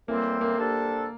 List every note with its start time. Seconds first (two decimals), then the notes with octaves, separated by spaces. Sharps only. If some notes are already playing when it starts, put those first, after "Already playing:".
0.08 A2 E3 G3 A#3 C4
0.41 A#3
0.57 C3 G3 D4 A4